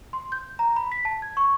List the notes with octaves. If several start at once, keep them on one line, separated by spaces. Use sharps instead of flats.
C6
G6
A#5
B5
B6
A5
G#6
C#6